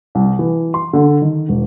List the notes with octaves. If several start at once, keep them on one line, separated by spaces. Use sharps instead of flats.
C2
E3
C6
D3
D#3
E1